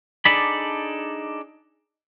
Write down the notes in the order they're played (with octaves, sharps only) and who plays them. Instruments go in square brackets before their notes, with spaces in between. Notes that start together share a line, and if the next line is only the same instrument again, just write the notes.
[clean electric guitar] D4 D#4 G#4 A4 D5 B5